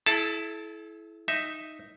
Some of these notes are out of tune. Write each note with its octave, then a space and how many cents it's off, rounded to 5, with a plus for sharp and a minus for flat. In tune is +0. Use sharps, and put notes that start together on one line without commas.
E4 +0 A4 -45 A5 +5
D#4 +0 E5 +0